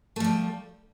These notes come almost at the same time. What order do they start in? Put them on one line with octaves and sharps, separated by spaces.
A3 F3 G3